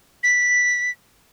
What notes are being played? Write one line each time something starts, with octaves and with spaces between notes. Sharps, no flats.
B6